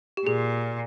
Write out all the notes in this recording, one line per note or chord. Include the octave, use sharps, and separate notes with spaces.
G4
A#2 G#4